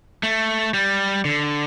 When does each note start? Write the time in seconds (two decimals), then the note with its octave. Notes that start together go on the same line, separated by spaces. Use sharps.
0.23 A3
0.74 G3
1.25 D3